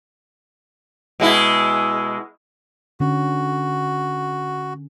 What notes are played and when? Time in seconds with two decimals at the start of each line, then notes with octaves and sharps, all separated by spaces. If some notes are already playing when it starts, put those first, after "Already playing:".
1.20 B2 G#3 E4
3.00 D3 C#4 F#4